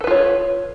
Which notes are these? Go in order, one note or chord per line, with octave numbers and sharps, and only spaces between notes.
F4 A4 B4 C#5